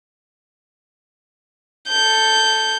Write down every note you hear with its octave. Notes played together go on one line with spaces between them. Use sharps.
A4 G6